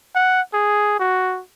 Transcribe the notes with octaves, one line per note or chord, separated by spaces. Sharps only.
F#5
G#4
F#4